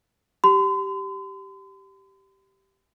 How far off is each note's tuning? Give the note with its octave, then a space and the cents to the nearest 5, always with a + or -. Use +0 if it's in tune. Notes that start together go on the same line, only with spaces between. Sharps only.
G4 -10 C6 -45